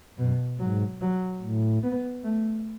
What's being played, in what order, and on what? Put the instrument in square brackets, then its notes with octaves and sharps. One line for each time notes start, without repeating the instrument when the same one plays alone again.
[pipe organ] F#2 [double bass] B2
[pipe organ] G#2 [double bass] F#3
[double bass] F#3
[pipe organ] A2
[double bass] B3
A3